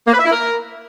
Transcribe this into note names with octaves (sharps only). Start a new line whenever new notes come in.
A#3
B4
E5
E4
A#4